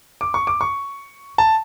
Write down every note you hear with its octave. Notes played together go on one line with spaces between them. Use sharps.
D6
C#6
D6
C#6
A5